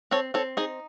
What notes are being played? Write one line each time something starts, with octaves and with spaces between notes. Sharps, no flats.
C4 A4 C#5
C4 A4 C#5
D#4 G#4 C5